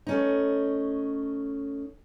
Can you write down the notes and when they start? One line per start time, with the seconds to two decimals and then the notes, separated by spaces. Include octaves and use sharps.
0.07 A3 C#4 D#4